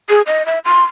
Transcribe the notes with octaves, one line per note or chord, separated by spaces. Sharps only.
G#4
D#5
E5
C6